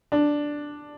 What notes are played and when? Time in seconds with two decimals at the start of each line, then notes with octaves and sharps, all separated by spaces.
0.12 D4